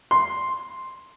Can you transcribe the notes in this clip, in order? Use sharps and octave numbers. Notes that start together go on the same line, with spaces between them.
C6